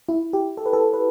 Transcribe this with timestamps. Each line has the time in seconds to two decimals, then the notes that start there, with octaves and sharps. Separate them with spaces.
0.09 E4
0.33 G4
0.57 A4
0.66 B4
0.73 A4
0.94 B4